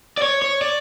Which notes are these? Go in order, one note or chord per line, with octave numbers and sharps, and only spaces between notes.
D5
C#5
C#5
D5